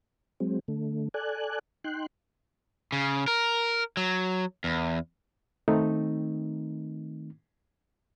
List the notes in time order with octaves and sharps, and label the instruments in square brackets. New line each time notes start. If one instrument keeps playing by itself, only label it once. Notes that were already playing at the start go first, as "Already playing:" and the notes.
[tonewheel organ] F#3 G#3 C4
D3 A3
A4 D5 G#5 F#6
D#4 G5 C6 F#6
[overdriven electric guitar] C#3
A#4
F#3
E2
[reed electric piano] D#3 A3 C4 D#4